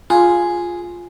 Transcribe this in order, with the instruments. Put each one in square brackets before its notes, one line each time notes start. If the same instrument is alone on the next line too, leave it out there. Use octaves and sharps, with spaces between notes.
[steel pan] F4 [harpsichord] G#4